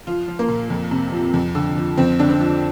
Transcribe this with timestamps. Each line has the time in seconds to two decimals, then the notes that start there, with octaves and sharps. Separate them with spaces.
0.07 F3 F4
0.28 F3
0.39 A#3
0.49 A#2
0.70 F2
0.91 C3
1.12 F3
1.34 F2
1.55 D3
1.77 F3
1.97 F2 C4
2.19 D3 D4
2.30 C4
2.40 F3